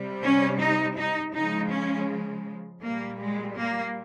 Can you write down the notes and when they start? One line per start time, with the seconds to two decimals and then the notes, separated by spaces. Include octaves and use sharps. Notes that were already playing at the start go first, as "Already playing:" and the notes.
Already playing: C3 G3
0.24 C#4
0.61 D#4
0.98 D#4
1.34 C#3 F3 G#3 D#4
1.72 C#4
2.83 A#2 G3 A#3
3.20 G#3
3.57 A#3